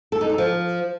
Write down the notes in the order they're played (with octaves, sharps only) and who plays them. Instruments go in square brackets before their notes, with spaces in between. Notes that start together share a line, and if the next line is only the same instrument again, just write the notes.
[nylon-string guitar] A4
D#4
A4
F3